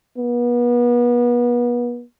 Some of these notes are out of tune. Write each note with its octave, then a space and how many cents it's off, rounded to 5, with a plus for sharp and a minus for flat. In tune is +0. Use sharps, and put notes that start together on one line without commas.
B3 -35